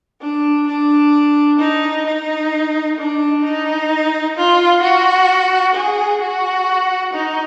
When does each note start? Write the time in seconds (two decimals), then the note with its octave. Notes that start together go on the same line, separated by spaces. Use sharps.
0.21 D4
0.67 D4
1.59 D#4
2.06 D#4
2.98 D4
3.43 D#4
4.36 F4
4.82 F#4
5.74 G#4
6.21 F#4
7.13 D#4